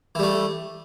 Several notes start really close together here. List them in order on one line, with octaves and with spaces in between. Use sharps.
E3 G3 A3